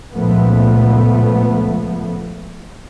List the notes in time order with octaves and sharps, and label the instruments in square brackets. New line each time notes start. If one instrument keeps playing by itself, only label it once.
[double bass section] C#2 A#2 F3 A3 B3